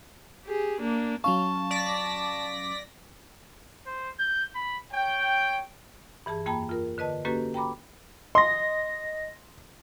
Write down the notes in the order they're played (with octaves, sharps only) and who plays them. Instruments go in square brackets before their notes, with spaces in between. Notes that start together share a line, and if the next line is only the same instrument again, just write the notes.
[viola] G4 G#4
A#3 D4
[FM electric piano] F#3 C#4 F5 [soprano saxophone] A5 [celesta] C#6
[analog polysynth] D5 A#6 B6
[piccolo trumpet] C5
G6
B5
[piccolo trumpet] C#5 [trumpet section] G5
[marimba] G2 E3 G#4 A5
F2 A#3 G5 A5 B5
F4 A#4
D3 B4 D#5 A5
A#3 C#4 F#4 G4 A4 B4
G5 A#5 B5 D6
[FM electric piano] D#5 A#6 [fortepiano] C6